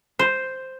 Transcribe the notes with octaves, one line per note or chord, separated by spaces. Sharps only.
C5